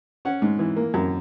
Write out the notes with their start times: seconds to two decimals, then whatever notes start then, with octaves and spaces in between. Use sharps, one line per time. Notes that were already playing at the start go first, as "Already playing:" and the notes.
0.25 C#4 F#5
0.42 G#2
0.59 E3
0.76 A#3
0.94 F#2